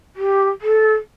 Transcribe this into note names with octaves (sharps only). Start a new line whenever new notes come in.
G4
A4